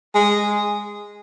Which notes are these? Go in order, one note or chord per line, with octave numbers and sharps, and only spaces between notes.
G#3